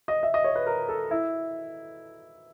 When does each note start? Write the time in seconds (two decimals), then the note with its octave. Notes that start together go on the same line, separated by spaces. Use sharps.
0.08 D#5
0.23 E5
0.34 D#5
0.44 C#5
0.56 B4
0.66 A#4
0.89 A4
1.11 E4